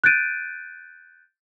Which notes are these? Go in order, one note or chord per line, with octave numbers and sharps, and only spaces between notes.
F#6 G6 A6 D7 D#7